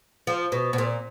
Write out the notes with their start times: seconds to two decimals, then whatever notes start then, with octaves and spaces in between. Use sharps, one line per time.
0.27 F3
0.52 B2
0.73 B2
0.78 A#2